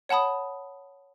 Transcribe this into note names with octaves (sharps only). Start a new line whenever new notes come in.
C#5 F#5 A5 B5 D#6